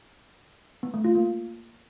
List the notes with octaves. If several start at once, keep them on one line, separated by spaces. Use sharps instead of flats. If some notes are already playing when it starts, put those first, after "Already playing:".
B3
A3
F4
A#3